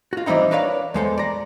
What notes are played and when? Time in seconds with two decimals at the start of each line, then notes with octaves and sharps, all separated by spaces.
0.13 F4 F#4
0.26 E3 G3 C4 D#4 E4
0.51 D4 A#4 B4 C#5 D5 F5
0.94 E2 G#3 A4 C5
1.18 D5 A#5